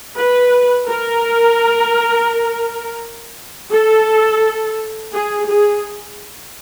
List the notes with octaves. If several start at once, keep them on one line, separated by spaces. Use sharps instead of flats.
B4
A#4
A4
G#4
G#4